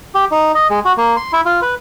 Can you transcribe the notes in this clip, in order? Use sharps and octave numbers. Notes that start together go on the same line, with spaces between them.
G4
D#4
D#5
G#3
F#4
A#3
C6
E4
F4
B4